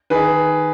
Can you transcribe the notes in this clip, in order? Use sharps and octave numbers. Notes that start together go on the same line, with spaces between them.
D#3 G#4 B4